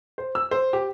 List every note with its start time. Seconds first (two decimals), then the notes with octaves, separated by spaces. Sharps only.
0.18 C5
0.35 E6
0.51 C5
0.73 G4